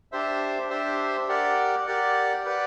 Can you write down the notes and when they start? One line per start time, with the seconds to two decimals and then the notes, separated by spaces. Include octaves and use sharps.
0.12 D4 G4 C5 E5
0.70 D4 G4 C5 E5
1.28 G4 A#4 D5 F#5
1.87 G4 A#4 D5 F#5
2.45 G4 B4 D5 F#5